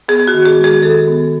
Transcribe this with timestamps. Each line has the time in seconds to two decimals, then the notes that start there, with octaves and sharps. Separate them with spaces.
0.08 B3 G#4
0.20 G#4
0.28 F#4
0.34 D#3
0.46 G#4
0.58 G#3
0.64 G#4
0.83 D#3 A4
1.07 B3